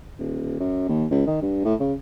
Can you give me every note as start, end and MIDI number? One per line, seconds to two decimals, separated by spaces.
0.19 0.55 27
0.60 0.89 42
0.89 1.06 39
1.11 1.23 37
1.27 1.38 51
1.42 1.61 43
1.65 1.74 45
1.80 1.93 49